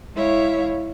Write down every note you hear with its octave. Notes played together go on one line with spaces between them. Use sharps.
G#3 E4 C#5 E5 F5